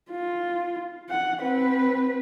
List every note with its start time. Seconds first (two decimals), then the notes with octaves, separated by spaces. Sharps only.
0.11 F4
1.10 F#5
1.40 C4 B4